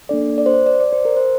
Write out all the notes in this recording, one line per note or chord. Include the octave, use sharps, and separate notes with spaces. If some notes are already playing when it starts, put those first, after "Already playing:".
A#3 D4 A4 D5
D5
C5
D5
D5
D5
C5
A#4
C5